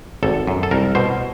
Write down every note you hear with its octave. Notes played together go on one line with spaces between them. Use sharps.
G#1 A4
F#2
A4
C2 A#4
B2 C5